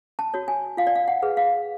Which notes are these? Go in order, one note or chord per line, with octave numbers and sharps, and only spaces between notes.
A5
F#4 C#5
G#5
F4 F5
D5
F5
F#5
G#4 B4
F5